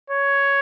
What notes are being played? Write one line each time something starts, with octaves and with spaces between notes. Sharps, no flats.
C#5